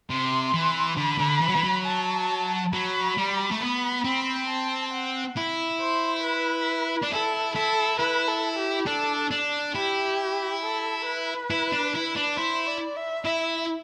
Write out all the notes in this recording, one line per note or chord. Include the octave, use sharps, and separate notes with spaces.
C3 C6
E3
D3 B5
D3
E3
F#3
E3
F#3
A5
F#3 B5
G3
A3
B3 B5
C4
A5
F#5
E4
C5
B4
D4
E4 A4
E4 A4
E4 B4
A4
G4
D4 A4
D4
E4 G4
A4
B4
E4
D4
E4
D4
E4 C5
D5
E5
E4 E5